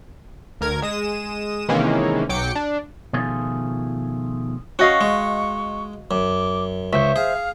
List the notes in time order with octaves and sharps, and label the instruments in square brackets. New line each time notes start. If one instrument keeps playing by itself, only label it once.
[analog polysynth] D2 A#4 G#6
G#3 D#6 E7
C3 D#3 E3 G#3 A#3 C#4
B1 F#3 G5 D6 C#7
D4
[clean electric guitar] B2 D#3 F3 A3 F4 G#4
[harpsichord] C#4 [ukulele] F#4 D#5 F5 [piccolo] C#6
[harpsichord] G#3
[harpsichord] F#2 [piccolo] D6
[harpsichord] C#2 [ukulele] C5 E5 [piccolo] C#6
[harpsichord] G#4 [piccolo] F5